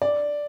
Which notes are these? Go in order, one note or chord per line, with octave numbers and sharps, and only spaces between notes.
D5